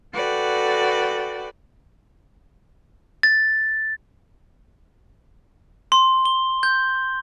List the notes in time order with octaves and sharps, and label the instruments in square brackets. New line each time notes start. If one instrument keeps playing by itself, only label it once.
[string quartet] F#4 A4 B4 D5 G5
[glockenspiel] A6
C6
G7
G6